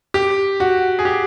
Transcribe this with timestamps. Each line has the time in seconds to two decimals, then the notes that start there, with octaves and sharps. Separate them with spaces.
0.14 G4
0.60 F#4
0.99 G#4
1.05 G4